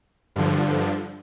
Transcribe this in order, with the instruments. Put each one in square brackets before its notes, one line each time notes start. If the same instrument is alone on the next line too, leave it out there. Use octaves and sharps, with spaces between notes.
[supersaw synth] G2 D3 F3